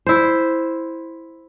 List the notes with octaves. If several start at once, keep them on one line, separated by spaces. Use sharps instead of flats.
E4 C5